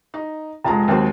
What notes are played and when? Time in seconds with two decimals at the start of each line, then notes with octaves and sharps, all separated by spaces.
0.14 D#4
0.64 F1 G#3 F4 A5 A#5
0.88 D#2 F#3 C4